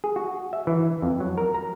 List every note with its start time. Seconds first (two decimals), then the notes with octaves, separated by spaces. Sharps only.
0.04 G#4
0.16 F#4
0.53 E5
0.67 E3
1.02 F2
1.20 F#3
1.38 A#4
1.54 A#5